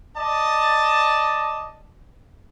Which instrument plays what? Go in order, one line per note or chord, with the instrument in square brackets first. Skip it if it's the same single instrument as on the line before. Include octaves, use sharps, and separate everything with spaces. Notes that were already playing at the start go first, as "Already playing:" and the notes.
[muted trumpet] D5 [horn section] D#5 A5